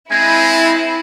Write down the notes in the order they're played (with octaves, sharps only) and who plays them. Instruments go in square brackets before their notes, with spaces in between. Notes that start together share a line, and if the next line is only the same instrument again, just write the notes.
[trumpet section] G#3 C4 [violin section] E4 [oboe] G#5